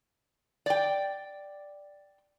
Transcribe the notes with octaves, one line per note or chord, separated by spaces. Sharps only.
D5 G5